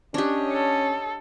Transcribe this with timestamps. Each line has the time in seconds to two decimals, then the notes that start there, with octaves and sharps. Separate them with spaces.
0.14 C#4 D4 G4 C#5 D#5
0.52 A4